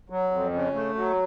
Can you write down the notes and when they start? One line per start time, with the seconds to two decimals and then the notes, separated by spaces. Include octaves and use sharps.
0.10 F#3
0.31 F2
0.53 C#3
0.74 A3
0.95 F#3